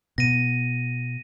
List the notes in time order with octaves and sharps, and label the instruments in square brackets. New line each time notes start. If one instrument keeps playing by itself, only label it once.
[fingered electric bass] B2 [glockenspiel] A#6 D#7